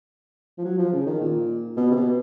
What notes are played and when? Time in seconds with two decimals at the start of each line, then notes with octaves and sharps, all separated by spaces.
0.58 F3
0.65 F#3
0.78 F3
0.93 C#3
1.07 D#3
1.21 A#2
1.77 B2
1.91 C3
1.96 B2